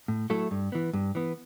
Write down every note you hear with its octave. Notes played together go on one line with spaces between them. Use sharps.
A2
F#3 A3 E4 A4
G2
E3 B3
G2
E3 B3